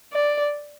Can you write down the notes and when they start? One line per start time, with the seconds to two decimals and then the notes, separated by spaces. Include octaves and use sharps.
0.13 D5